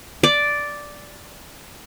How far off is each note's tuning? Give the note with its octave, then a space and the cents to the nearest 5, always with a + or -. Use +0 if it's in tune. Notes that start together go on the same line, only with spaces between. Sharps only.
D5 -5